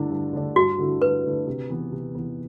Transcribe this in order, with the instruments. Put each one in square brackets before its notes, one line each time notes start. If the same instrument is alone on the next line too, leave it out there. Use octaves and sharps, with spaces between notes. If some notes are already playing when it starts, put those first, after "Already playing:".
Already playing: [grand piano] G2 D3 A3 D4 [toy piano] E4
[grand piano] G2
D3 A3 D4
[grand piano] G2 [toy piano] F#4
[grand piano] D3 A3 E4
[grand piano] G2 [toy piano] B4
[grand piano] D3 A3 E4
C3
E3 B3
C3
E3 B3